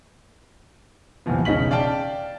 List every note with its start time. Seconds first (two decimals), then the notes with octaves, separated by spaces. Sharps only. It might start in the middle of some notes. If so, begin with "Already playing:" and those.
1.26 C2 A#2 E3 F3 B3
1.45 E1 C#3 D#4 B6 F#7
1.71 D5 F5 G5 A5